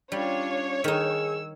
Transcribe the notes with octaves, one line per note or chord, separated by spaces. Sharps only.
G3 C#4 D4 F4 C#5
D#3 D#4 G#4 E6